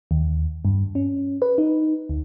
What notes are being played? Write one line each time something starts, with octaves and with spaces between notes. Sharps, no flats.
D#2
G2
C#4
B4
D#4
D2